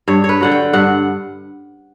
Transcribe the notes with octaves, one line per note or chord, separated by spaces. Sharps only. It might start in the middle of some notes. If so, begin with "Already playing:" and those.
G2 C#5
C#5
B4
D3 F#3 F#5
G5
G2 F#5